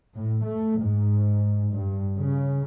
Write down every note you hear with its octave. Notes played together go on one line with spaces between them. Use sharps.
A2
A3
G#2
G2
C#3